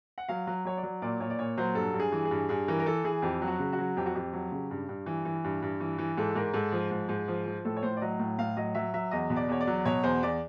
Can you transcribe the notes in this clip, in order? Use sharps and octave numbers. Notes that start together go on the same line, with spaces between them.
F#5
F#3 F5
F#3
F#3 C#5
D5
F#3
A#2 D5
A#2 C#5
D5
A#2 C#5
F#3 C5
G2 A4
G2
G#4
E3
G#4
G2
G2 G#4
E3 A#4
A#4
E3 A4
E3 G#4
F2 G4
F#3
F#4
C#3
F#4
F#3
F2 G4
F#4
F2 G4
F#3
C#3
G2
G2
E3
E3
G2
G2
E3
E3
G#2 A4
G#2 A#4
G#2 A4
F3
G#2
G#2
F3
F3
A2 A4
C#5
A2 C5
D5
F#3 D#5
A2
A2 F5
F#3 D#5
F#3 E5
F#3 E5
E2 D#5
B2
D5
E2 C#5
D5
F#3
B2 C#5
E2 C5
E2 D5